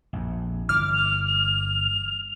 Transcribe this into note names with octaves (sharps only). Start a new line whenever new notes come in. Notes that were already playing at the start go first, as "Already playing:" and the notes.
A#1 F2
G1 E3 D6 F6
F7
F7